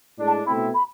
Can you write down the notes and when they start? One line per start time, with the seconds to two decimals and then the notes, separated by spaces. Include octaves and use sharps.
0.18 A2 G#3 D4
0.27 A5
0.46 B2 A3 C4 E4 B5
0.74 B5